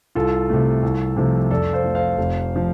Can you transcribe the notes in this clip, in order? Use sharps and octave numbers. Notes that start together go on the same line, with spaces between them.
C2 F4 A4
C3 A3
C2
C3 F3 A3
F2 A4 D5
C5 F5
F3 A3
C5 F5
F1
F3